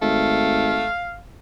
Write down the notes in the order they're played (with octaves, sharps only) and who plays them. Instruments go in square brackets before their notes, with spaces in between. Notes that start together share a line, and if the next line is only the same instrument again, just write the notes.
[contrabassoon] G#1 [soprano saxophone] A3 [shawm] F5